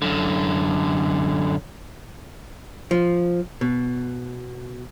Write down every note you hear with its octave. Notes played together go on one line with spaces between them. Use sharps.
F#2 D3
F3
B2